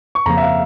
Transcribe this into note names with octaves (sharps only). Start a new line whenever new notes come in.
C#6
F2 C#3 F3 A#3 A#5
E5
F5